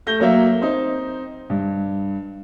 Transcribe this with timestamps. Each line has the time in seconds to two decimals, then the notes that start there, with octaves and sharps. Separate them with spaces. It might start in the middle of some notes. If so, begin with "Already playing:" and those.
0.07 A3 G6 A#6 G7
0.20 F#3 A#3 C#5 E5
0.61 C4 D#4
1.50 G2